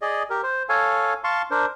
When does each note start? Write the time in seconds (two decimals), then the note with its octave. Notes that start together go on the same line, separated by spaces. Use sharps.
0.02 G#4 D5 D#5
0.30 G4 A#4
0.43 C5
0.69 A4 C#5 F5 G#5
1.24 F5 A5 C6 C#6
1.51 D4 A#4 C5